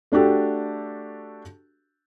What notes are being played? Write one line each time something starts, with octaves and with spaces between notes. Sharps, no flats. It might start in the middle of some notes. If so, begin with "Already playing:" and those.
A3 D4 F#4 G4 A4